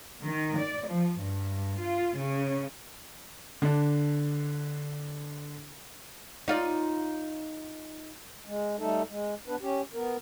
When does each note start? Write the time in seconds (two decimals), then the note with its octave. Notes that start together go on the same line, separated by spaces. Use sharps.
0.24 D#3
0.57 D5
0.89 F3
1.21 G2
1.82 F4
2.19 C#3
3.62 D3 D4
6.48 D#4 F4 D5
8.46 G#3
8.79 G3 A3 D#4 A4
9.09 G#3
9.47 B3 D4 B4
9.61 C#4 G4
9.94 B3 A#4